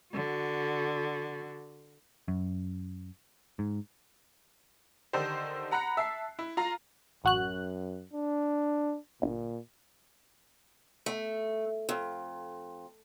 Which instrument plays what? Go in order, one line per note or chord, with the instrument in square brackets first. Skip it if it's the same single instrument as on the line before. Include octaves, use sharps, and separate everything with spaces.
[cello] D3 F#4
[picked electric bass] F#2
G#2
[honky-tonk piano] D3 D#3 D#4 G4 C5
F#5 A#5 B5 F#6 C#7
E5 A5 C7
E4
F4 F5 A#5
[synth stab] A1 F#4 F#6 [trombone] F#2
[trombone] D4
[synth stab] G1 [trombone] A#2
[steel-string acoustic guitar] A3
F2